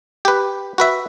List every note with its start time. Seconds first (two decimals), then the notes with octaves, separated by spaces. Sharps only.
0.25 G4 B4
0.78 F#4 B4 E5